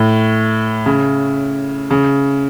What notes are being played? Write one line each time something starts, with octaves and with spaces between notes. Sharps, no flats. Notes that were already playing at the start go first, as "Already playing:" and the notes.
Already playing: A2
C#3
C#3